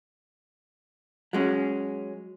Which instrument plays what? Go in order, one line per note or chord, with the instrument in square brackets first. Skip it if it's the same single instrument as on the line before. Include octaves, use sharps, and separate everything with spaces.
[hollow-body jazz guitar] F#3 G#3 C#4